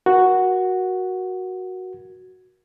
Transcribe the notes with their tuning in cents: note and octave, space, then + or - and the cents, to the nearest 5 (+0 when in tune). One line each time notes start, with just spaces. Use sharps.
F#4 +0 A#4 +25